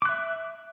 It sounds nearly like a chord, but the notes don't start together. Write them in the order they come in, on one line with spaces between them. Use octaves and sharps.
D6 F#6 E5